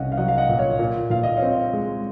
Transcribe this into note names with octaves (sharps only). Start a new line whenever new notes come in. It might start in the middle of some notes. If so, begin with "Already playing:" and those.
Already playing: C2 C#4 D#5 F5 F#5
F5
F#3 D#5 F#5
F5
D#5 F#5
A#2
C#5 F5
A#2
A#2 F5
D#5
C#5 F5
C4
G#3